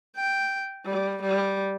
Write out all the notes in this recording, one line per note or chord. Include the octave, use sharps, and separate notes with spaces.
G5
G3
G3